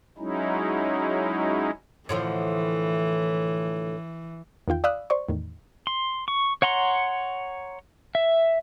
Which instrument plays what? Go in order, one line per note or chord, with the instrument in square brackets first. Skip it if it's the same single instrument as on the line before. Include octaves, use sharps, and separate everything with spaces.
[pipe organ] F#3 G#3 C#4 D#4 E4
[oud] A2 D3 F3 [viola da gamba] E3
[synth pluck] E2 D#3 F4 G5
D5 F5 B5 D#6 E6 F#6
C5 D5 C#6
E2 A2 D#3
[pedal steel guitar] C6
C#6
C#5 F#5 A#5 C6
E5